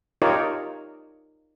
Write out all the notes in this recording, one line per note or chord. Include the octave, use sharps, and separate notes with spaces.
D#4 F4 G4 A#4 C#5 D5